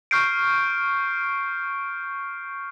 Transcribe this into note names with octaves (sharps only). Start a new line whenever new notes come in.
C#6 F6 G6 C7 D7